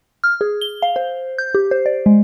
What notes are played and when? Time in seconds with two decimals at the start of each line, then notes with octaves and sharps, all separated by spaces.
0.24 F6
0.41 G#4
0.61 G7
0.82 F5
0.96 C5
1.38 G6
1.55 G4
1.71 C5
1.86 D5
2.06 G#3